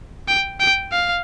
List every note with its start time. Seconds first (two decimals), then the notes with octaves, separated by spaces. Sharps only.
0.28 G5
0.60 G5
0.92 F5